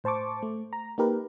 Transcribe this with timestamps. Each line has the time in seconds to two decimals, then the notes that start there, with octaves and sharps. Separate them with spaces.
0.04 A2 C5 A5 C#6 D6
0.42 A3
0.73 A#5
0.98 A#3 D#4 G4 A#4 B4